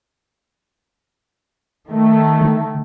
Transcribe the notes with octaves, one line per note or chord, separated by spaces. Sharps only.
D#3 A3
D3